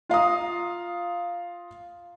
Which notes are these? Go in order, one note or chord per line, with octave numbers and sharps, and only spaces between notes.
F4 F5 A#5 D#6